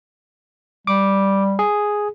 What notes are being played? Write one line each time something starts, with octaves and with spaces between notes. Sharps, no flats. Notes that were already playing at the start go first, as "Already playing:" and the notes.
G3 D6
G#4